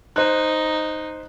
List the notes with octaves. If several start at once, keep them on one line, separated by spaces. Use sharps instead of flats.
D#4 C5 F#6